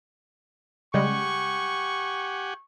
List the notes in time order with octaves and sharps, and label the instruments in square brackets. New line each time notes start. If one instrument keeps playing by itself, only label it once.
[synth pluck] C#3 G3 G#3 [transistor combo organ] G4 F#5 G#5 [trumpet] C#6